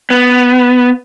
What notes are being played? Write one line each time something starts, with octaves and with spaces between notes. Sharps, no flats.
B3